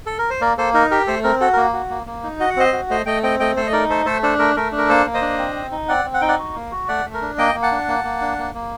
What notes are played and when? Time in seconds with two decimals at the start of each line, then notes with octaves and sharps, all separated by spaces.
0.06 A4
0.19 A#4
0.30 C5
0.41 A#3 A#4 D5
0.58 A#3 A4 C5
0.74 D#4 A#4
0.91 G4 A#4
1.07 A3 A4 C5
1.24 C4 A#4
1.40 F#4 A4
1.53 A#3 A#4
1.73 F#4
1.90 A#3
2.07 A#3
2.23 D#4
2.40 F#4 D#5
2.50 F#5
2.57 C4 C5 D#5
2.73 F#4
2.90 A3 C5 D#5
3.06 A3 D#5 G5
3.23 C4 D#5 G5
3.40 A3 D#5 G5
3.56 A3 A4 C5
3.67 D#5
3.72 D#4 A#4 D5
3.89 A3 A4 C5
4.06 A3 A4 C5
4.23 D4 A4 C5
4.39 A3 A#4
4.56 A3 A#4
4.72 D4
4.78 A#4
4.89 A#3 A4 C5
5.06 A#3
5.14 C5 D#5
5.22 D4
5.38 C4
5.55 C4
5.72 D#4
5.88 C4 D5 F#5
6.05 C4
6.14 F#5
6.21 D#4 G5
6.28 D5 F#5
6.39 F#4
6.56 A#3
6.72 F#4
6.88 A3 D5 F#5
7.05 A3
7.14 A#4
7.22 D4
7.38 A#3 D#5 G5
7.54 A#3
7.62 F#5 A5
7.71 D4
7.88 A#3
8.04 A#3
8.21 D4
8.38 A#3
8.54 A#3